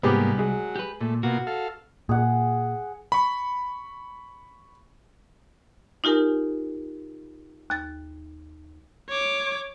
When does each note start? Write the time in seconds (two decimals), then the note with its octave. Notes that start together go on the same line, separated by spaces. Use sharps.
0.03 C2 G#2 G3 A#3 B3 G4 G#4
0.38 F#3 G#3 G#4
0.76 G4 B4
1.01 A#2 A3
1.23 B2 A#3 F4 F#4
1.47 A4 F5
2.09 A#2 G#4 F#5
3.12 B5 C#6
6.04 D#4 F4 G4 A#4 G#5
7.70 D#2 A6
9.09 C#5 D6